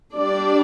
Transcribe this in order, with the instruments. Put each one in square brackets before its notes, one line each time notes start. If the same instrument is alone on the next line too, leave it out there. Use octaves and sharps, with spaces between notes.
[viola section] G3 D4 D5